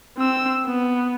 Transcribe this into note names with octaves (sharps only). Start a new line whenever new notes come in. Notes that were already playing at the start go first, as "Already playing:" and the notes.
C4 E6
B3